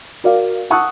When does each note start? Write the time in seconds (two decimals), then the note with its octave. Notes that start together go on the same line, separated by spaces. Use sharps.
0.24 F#4 A#4 D5 F5
0.70 F#5 A5 C#6 D#6 E6 F#6